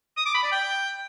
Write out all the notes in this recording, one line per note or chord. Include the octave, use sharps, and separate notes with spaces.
D#6
D6
B5
D5
G5